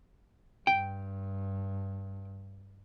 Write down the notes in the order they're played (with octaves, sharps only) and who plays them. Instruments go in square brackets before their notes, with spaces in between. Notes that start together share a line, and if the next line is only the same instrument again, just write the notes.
[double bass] G2 [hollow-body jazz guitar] G5